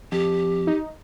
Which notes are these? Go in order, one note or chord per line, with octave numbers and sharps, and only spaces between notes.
F2 G4
D#4